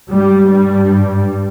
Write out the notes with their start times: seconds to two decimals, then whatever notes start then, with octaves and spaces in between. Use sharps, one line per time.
0.10 G2 G3
0.51 G3